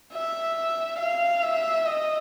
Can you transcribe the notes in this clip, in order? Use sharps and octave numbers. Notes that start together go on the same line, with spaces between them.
E5
F5
E5
D#5